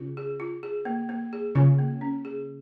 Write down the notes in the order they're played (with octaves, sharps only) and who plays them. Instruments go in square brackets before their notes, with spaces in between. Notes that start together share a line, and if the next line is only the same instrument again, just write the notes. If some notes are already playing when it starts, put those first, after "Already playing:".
Already playing: [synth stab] C#3 [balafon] F4
[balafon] G#4
F4
G#4
A#3
A#3
G#4
[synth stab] C#3 [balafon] F4
[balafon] A#3
C#4
G#4